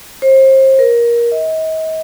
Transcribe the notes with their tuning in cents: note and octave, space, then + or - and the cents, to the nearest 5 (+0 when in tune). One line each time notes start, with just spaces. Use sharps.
C5 +30
A#4 +20
D#5 +40